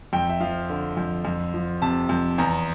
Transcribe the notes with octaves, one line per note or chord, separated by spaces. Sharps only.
F2 G5
E5
F3 F5
D3
F2
F2
F3
C3 A5
F2
E2 A#5